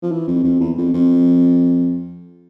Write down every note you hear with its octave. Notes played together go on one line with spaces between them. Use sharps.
F3
E3
F2
F2
E2
F2
F2